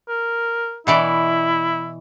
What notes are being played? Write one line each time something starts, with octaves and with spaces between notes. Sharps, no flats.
A#4
B2 E3 E4 D5